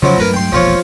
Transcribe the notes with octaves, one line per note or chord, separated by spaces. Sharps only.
C#3 F3 F#3 E4
G2 F#3 A3 A#4 B4 A#5
G5 C6
E1 A#1 F2 F3 F4 C#5